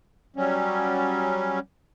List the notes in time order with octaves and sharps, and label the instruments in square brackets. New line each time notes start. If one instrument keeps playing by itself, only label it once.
[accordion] F#3 G3 C#4